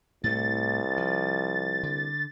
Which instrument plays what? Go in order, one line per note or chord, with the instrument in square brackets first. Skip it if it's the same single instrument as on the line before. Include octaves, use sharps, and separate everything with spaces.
[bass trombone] C2 [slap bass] A2 A3 [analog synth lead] A6
[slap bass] F3
D3